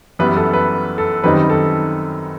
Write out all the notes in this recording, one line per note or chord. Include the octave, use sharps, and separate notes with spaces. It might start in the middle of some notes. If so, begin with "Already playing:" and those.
F#2 E3 G3 B3 B4
A4
B4
A4
F#2 D#3 G3 C4 D#4 B4
A4